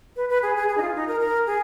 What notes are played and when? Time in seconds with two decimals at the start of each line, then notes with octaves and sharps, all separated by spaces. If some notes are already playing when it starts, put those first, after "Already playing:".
0.16 B4
0.29 B4
0.43 G#4
0.56 G#4
0.68 G#4
0.77 D#4
0.82 F4
0.95 D#4
1.08 A#4
1.20 A#4
1.47 G#4